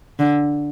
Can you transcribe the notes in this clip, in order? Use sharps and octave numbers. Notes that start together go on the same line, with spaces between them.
D3